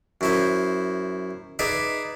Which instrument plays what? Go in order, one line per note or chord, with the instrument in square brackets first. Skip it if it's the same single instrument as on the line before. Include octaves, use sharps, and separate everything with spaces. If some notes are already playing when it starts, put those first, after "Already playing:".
[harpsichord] F#2 E4 C5
D#4 G#4 B4 D5 E5